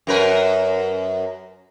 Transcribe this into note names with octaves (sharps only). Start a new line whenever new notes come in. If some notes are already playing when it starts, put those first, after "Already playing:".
F#2 A#4 B4